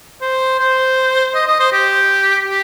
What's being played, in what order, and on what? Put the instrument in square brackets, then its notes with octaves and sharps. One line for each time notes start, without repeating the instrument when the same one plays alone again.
[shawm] C5
C5
D#5
D#5
C5
G4
G4